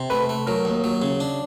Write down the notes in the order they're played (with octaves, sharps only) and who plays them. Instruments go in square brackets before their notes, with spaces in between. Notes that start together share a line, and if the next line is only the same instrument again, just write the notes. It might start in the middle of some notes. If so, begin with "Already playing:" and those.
Already playing: [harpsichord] C3
[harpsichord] A3 [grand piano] B4
[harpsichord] A3
[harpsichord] F#3 [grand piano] A#4
[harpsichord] D#2
F#3
C#3
D4